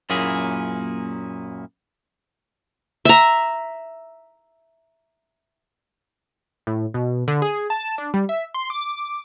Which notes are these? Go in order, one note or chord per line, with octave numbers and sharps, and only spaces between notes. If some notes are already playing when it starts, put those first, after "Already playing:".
F#2 A#2 A#3 C#4 E4 G#4
E5 A#5
A2
B2
D3
G#4
A5
D4
G3
E5
C6
D6